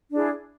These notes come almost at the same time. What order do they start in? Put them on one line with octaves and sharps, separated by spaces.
D4 E4 G#4